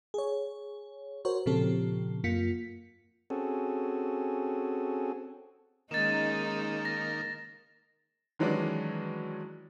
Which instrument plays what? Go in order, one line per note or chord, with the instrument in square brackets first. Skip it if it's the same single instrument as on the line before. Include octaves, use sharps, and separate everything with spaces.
[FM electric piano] G#4 C#5
F#4 A#4 C5 C#5
A#2 C#3 F3 C4 G4 A4
F#2 A#3 F4 B6 C#7
[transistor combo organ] C4 C#4 F#4 G#4 A4
[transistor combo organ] D#3 A#3 [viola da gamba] G#3 C#4 D#4 [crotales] A6 E7
[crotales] A#6
[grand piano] D#3 E3 F#3 G#3 C#4 D4